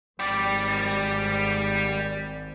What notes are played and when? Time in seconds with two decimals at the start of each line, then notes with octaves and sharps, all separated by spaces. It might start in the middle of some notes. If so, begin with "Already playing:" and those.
0.20 G#1 G#2 G3 D5